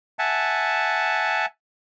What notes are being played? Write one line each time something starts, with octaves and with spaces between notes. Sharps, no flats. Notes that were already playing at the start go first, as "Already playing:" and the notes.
E5 F#5 G#5 A5